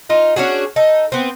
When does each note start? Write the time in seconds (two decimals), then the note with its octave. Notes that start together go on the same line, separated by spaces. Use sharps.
0.09 D#4 F4
0.36 C#4 D4 F#4 G#4
0.76 D#4 A4
1.12 B3 C4